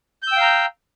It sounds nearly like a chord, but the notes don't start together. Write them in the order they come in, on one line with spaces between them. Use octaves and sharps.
G6 E6 G5 F5 A#5